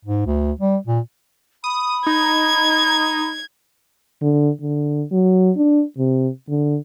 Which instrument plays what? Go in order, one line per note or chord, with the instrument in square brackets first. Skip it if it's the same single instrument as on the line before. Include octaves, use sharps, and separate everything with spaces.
[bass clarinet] G#2
D2
G3
A#2
[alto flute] B5 [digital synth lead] D#6
[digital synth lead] D#4 [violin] G#6
[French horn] D3
D3
F#3
D4
C3
D3